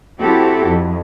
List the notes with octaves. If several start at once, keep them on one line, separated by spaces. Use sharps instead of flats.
C4 E4 F#4 G4 A4
F2